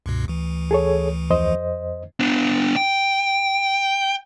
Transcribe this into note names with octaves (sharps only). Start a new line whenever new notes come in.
C#2 G2 B2
D2 E3
G#4 A4 C#5
F2 C5 D#5
B3 D4
G5